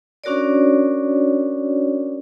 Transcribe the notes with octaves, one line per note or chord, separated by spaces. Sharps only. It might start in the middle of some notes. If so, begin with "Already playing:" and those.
C#4 D4 F#4 A#4 C#5 D5